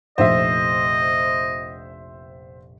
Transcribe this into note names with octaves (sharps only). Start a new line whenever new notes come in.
F1 A#1 C5 D#5 E5